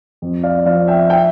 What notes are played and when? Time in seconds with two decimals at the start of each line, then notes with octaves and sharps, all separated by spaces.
0.22 F2
0.43 D5 F5
0.66 F3 D5 F5
0.88 E5 G5
1.10 E5 G5